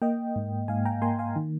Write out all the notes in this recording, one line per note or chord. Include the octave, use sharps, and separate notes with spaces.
A#3 D#5 G5
G#2
G#2 F5 G#5
G5 A#5
A#3 G#5 C6
F5 G#5
D#3